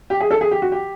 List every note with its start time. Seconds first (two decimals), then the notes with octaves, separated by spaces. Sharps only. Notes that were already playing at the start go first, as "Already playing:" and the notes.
0.10 G4
0.20 G#4
0.31 A4
0.41 G#4
0.51 G4
0.62 F#4
0.72 G4